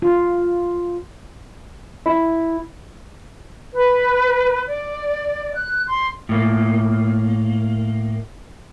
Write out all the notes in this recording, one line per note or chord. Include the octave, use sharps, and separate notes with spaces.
F4
E4
B4
D5
F#6
C6
A2 A#3